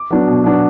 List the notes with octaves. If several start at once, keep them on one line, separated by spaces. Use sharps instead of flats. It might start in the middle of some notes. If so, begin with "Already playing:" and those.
Already playing: D6
F#3 B3 D4
B2
F#3 B3 D4